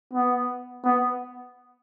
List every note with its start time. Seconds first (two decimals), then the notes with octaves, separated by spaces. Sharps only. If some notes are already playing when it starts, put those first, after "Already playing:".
0.14 B3
0.85 B3